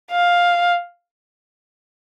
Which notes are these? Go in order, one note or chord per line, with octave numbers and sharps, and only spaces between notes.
F5